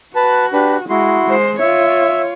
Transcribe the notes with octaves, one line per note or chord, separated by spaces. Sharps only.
F#4 B4 A5
D4 G4 B4
G#3 E4 F#4 C6
G#3 C5
F4 C#5 E5